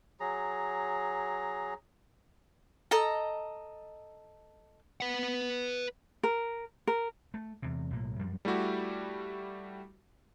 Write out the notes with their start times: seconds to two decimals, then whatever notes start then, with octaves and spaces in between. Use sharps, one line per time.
0.20 F#3 G#4 A#5
2.91 A4 D#5 A#5
5.00 B4 F#5
6.23 A#4
6.87 A#4
7.34 A3
7.62 E2 C3
7.91 B1 A2 A#3
8.19 F#2 F3 G3
8.45 G3 A3 E4 F#4 G4